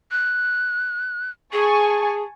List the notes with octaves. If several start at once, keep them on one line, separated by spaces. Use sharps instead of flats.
F#6
G#4 G#5 A5 C#6